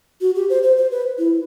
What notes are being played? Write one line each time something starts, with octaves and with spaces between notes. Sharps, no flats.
F#4
G4
C5
C5
C5
B4
E4